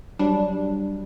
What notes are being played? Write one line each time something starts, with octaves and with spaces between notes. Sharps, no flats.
F#3 G3 D4